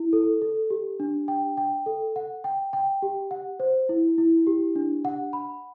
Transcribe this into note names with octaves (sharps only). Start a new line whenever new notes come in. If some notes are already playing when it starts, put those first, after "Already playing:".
Already playing: E4
A4
A4
G4
D4
G5
G5
A4
F#5
G5
G5
G4
F#5
C5
E4
E4
G4
D4
F#5
B5